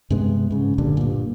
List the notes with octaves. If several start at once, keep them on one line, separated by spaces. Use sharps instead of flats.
G2 C3 G#3 B3
G#2 C#3
D1 G2 A#2 D3
G2 A#2